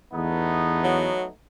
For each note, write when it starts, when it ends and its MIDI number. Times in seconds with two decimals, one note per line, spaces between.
0.14 1.10 40
0.14 1.30 57
0.14 1.30 59
0.14 1.30 63
0.84 1.25 54